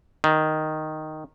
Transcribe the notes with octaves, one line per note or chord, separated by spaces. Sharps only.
D#3